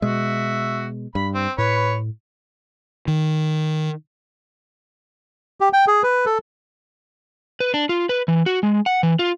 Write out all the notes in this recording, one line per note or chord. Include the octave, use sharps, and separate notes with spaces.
B2 G#3 F#4 E5
G2 B5
C4
A2 B4 C#5
D#3
G4
G5
G#4
B4
A4
B4
D4
F4
B4
E3
F#4
G#3
F#5
E3
F4